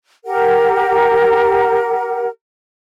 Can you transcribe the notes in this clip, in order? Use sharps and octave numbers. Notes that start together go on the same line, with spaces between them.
G4 A#4 F#5